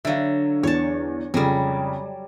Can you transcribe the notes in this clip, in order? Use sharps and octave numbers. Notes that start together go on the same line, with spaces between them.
D3 F#3 E5 F5
E2 C#5 A5
F2 C#3 F#3 G3